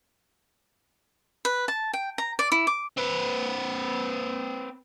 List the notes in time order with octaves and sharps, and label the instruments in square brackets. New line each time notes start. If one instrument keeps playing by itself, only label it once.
[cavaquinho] B4
A5
G5
A#5
D5
E4
D6
[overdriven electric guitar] C4 B4